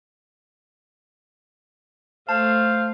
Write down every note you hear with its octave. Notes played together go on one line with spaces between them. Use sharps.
A3 C5 F5 A5